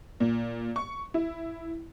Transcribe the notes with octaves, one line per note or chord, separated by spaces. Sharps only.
A#2
C#6
E4